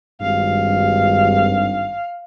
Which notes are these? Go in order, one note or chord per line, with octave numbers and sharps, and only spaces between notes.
G#1 G2 F5